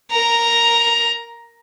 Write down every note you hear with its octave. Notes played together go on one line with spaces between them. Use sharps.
A#4 A#5